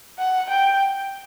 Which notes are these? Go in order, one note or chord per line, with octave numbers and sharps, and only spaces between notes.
F#5
G5